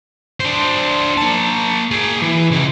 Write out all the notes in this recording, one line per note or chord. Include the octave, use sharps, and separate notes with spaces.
D4 C5
A#3 A5
G#4 G5
E3
C#2